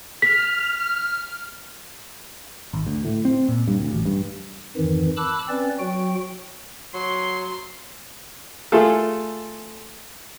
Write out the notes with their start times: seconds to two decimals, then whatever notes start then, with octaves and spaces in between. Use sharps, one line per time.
0.22 F6 B6
2.73 G#1
2.86 D2
3.05 A2
3.25 C4
3.48 A#2
3.68 G2
3.80 D2
3.93 A1
4.05 G2
4.77 F2 G#2 D#3 E3
5.17 A5 B5 D6 E6 F#6
5.48 C4 C#4 B4 D5
5.79 F#3 F#4 G5
6.94 F#3 C6
8.72 A3 F4 G#4 A4